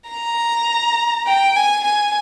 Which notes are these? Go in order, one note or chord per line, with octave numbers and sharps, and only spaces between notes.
A#5
G5
G#5
G#5